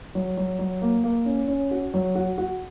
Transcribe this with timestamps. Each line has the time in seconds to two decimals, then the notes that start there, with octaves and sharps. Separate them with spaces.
0.15 F#3
0.37 F#3
0.59 F#3
0.82 A#3
1.04 A#3
1.26 C#4
1.48 C#4
1.71 F#4
1.94 F#3
2.15 F#4
2.38 F#4